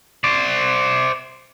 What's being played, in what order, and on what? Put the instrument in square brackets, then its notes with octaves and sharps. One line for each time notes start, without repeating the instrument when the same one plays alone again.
[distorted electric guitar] C5 D5